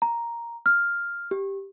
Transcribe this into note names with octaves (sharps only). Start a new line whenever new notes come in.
A#5
F6
G4